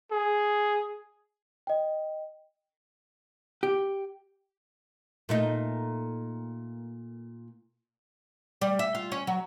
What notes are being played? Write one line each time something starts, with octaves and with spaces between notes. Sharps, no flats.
G#4
D#5 G5
G4
A#2 A3 D#4
G3
E5
F4
C#4
F#3